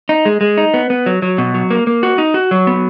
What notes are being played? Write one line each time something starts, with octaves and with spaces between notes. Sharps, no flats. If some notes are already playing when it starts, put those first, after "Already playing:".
D#4
G#3
G#3
D#4
B3
B3
F#3
F#3
B2
F#3
A#3
A#3
F#4
D#4
F#4
F#3
B3